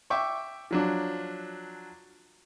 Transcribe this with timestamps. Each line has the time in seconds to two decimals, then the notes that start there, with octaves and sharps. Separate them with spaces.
0.10 E5 G5 C#6 D6
0.71 F3 F#3 D4